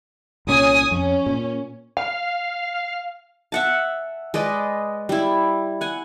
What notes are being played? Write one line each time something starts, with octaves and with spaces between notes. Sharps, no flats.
C2 A#2 C#4 C#5 G#5 D#6
F2 C#4
A#2
F5
E5 F#5 A5
G#3 B4 D5 D#5
G3 E4
F#5 G#5